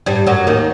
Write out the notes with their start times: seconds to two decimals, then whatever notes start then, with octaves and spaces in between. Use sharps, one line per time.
0.06 G2 G3
0.27 F#2 F#3
0.47 D#2 D#3